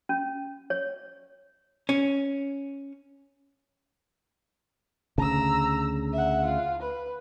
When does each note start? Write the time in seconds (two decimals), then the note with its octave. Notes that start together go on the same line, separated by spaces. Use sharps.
0.09 C#4
0.70 C#5
1.89 C#4
5.18 D2 C#3 A#5 E6
6.13 E5 F#5
6.44 F4
6.82 B4